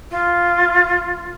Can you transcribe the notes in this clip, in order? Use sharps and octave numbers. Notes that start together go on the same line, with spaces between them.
F4